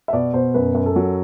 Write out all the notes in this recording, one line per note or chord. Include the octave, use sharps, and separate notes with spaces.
E5
B2 D5
B2 C5
F#2 B4
F#2
A4
F#3